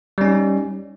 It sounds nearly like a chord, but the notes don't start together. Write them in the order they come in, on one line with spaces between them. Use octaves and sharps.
G3 C#4 D#4